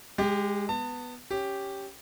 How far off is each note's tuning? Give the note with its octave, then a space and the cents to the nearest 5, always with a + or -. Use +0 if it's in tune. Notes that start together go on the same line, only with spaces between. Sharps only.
G#3 -15 G4 +15
B3 +0 A5 +35
C#4 +0 G4 +0